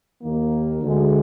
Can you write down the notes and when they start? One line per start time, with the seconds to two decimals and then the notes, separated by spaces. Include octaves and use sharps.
0.21 D#2 D#3 A#3
0.80 D2 D3 G#3